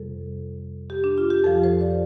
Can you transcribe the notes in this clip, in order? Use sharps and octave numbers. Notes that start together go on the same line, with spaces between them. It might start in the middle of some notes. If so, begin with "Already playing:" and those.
Already playing: F2 C3 G3 A4
G4
D4
F4
G4
F2 F3 A4
C5
D5